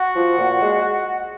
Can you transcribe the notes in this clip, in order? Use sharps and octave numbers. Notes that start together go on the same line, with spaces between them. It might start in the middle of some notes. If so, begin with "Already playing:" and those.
Already playing: F#4 F#5
F3
A#2
G#3